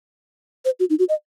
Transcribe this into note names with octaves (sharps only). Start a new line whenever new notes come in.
C5
F#4
D#4
F#4
D#5